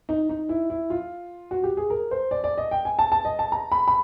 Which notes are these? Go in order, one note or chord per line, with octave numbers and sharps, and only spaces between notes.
D#4
D#4
E4
E4
F4
F#4
G4
G#4
A#4
C5
D5
D5
D#5
G5
G#5
A5
A5
D#5
A5
A#5
B5
B5